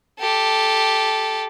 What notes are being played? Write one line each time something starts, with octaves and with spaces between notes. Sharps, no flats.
G4 A4